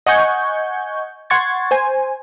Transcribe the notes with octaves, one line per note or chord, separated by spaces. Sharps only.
D#5 F#5 G#5 C#6 G6 G#6
F#5 C6 C#6 G#6 A6
C5 G#5